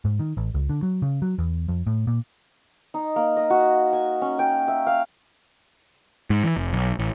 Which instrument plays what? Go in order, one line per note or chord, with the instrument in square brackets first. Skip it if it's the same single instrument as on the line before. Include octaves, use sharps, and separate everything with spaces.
[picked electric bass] G#2
D#3
A1
C#2
D3
F#3
C#3
F#3
E2
F2
A2
A#2
[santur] D#4
A#3
D#5
F#4
G#5
C#4
G5
E5
F5
[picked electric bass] G#2
E3
F1
B1
A1